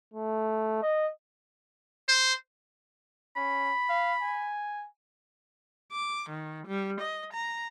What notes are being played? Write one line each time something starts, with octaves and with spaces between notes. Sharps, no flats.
A3
D#5
C5
C#4 B5
F5
G#5
D6
D#3
G3
D#5
A#5